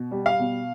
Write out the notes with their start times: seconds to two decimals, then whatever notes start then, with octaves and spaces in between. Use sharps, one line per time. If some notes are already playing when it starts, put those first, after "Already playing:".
Already playing: B2
0.11 G3
0.26 F5
0.39 B2